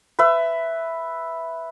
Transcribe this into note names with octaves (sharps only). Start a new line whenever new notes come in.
B4 E5